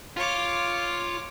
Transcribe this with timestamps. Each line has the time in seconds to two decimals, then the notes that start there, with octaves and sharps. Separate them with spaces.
0.17 F4 C#5 D6